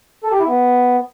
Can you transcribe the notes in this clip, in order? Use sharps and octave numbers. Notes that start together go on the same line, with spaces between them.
A4
G4
E4
B3